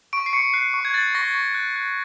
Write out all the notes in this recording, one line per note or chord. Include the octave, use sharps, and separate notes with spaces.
C#6 D7
C7
C#6 C#7
F#6 C7
C#6
G#6
F#6 A6
C#6 A#6
C#6
F#6
F#6